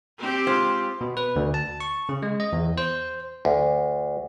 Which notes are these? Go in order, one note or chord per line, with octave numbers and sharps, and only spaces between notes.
C4 G4
G#3 F4 C5
B2
B4
D2
A5
C#6
C#3
G#3
D#5
E2
C5
D2